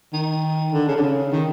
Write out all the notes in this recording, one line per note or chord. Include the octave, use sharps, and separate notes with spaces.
D#3
D3
C#3
D3
C#3
D#3